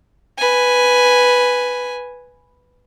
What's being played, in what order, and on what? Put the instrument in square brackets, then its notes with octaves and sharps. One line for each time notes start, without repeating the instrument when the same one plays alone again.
[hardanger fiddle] B4 G#5